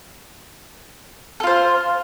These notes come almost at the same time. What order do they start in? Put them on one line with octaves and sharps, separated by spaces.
A4 F4 C5